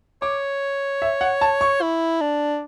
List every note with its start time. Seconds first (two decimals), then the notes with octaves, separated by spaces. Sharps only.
0.22 C#5 D6
1.02 E5
1.21 F#5
1.41 A5
1.61 C#6
1.82 E4
2.21 D4